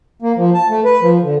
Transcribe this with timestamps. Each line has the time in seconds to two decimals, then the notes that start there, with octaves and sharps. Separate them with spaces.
0.22 A#3
0.37 F3
0.54 A5
0.69 A3
0.85 B4
1.02 F3
1.23 D3